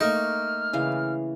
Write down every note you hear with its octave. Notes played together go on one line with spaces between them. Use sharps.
A3 A#3 D#4 C#6 F6
C#3 E3 F5